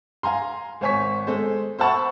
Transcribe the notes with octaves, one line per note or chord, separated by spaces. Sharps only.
F5 G#5 A#5 C6
G#1 C5 C#5 G#5 C#6 B6
G#3 A4 C5
C5 E5 F#5 A5 B5 C#6